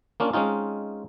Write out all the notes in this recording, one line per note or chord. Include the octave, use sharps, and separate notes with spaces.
A#3 C#4 D4 F4
G#3 C4 C#4 D#4 F4